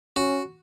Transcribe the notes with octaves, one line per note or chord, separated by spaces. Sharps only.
C#4 F#4